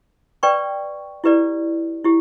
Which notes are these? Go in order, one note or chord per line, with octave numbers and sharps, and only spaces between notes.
B4 D5 G5 C#6
E4 G4 B4 D5
E4 G4